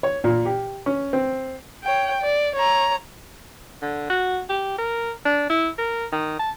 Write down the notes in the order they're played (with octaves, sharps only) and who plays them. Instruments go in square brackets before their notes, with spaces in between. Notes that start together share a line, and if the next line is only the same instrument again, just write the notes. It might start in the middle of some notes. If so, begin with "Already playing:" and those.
[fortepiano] C#5
A#2
G4
C#4
C4
[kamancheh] C#5 G5
D5
C#5 A#5
[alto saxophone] D3
F#4
G4
A#4
D4
E4
A#4
D#3
A5